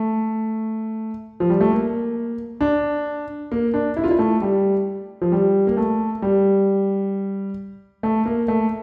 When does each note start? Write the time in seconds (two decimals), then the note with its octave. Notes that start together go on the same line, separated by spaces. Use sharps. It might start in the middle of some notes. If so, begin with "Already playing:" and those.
Already playing: A3
1.40 F3
1.50 G3
1.61 A3
1.71 A#3
2.61 D4
3.52 A#3
3.74 D4
3.97 E4
4.04 F4
4.11 E4
4.19 A3
4.41 G3
5.22 F3
5.32 G3
5.67 A#3
5.77 A3
6.22 G3
8.03 A3
8.26 A#3
8.48 A3